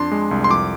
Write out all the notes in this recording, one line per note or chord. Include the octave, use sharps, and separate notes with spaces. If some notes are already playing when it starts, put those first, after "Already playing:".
Already playing: F2 D4 C6
G#3
C2
C6
F2 D6